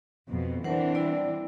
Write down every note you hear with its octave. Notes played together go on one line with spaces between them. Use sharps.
F2 B2
E3 C4 D4 A#4 C5 F#5
G3 E4 D5